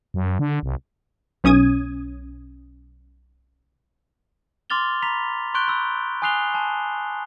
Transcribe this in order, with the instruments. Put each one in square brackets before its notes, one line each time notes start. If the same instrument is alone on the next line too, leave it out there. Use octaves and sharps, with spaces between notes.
[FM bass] F#2
D3
C2
[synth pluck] B1 C#4 D#6 G#6 D#7
[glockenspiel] C6 D6 F6 A6 F7 G7
A#5 B5 B6 F7
C6 C#6 F#6 G6 D7 G7
B5 E6
G#5 D#6 F#6 C7 F7 G7
G#5 A5